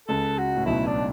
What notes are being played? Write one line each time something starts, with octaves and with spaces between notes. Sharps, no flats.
C#2 C#3 A4
F#4
A2
B1 B2 E4
D4